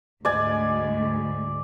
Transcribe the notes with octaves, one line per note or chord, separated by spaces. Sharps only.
D2 G#2 G#3 D5 G#5